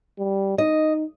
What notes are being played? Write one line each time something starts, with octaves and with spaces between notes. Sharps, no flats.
G3
D#4 D#5